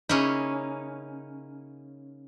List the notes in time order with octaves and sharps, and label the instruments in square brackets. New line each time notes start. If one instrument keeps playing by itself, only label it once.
[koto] C#3 A#3 E4 [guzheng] C#4 D#4